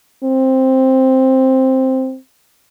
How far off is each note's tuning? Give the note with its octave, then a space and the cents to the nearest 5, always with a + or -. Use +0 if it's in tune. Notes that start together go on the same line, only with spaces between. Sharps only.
C4 +5